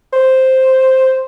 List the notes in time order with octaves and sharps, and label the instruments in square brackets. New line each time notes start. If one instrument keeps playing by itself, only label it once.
[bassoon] C5